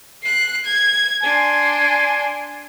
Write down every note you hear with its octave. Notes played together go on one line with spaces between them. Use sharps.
F#6 C7
G#6
D4 G#5 C6